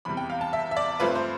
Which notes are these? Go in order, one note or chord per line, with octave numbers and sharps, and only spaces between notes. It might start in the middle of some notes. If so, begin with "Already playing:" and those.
E2 C3 G3 B5
G5
F5
A5
E5
E5
D5
G2 F3 A3 C4 B4
C5